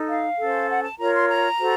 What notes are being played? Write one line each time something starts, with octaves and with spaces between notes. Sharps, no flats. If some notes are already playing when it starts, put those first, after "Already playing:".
Already playing: D#4 A4
F5
C#4 A4 C5
F#5
A5
F4 A#4 C#5 A#5
C6
A#5
F#4 A4 C5